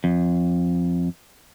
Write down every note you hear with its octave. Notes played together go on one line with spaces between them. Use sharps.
F2